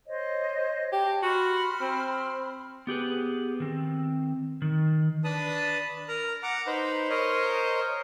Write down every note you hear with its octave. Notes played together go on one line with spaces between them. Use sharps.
C5 C#5 D#5
G4 A5
F#4 B5 C6 F6
C4
B3 G4 G#4 B4
D#3 C4
D#3
D4 B4 A5 B5 D#6
A#4 A#5
F#5 A#5 D6
D#4 B4 C5
A#4 C5 C#5 D#5